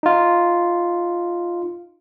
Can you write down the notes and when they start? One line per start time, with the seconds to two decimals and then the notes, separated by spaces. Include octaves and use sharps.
0.03 D#4 F4